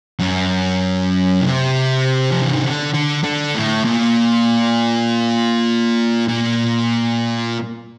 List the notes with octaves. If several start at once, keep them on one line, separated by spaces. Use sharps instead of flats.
F#2
C3
F3
E3
D#3
D3
D3
D3
A2
A#2
A#2